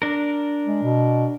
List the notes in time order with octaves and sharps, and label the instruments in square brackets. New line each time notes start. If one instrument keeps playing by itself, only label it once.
[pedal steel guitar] D4 A#4
[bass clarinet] G#3
B2